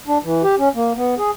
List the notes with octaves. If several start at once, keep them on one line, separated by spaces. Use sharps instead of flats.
D4
E3
G4
C#4
A#3
B3
G#4